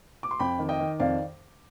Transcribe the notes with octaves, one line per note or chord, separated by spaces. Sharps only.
D6
C6
F2 G5 B5
D#3
D#5 G5
D#3
F2 D5 F5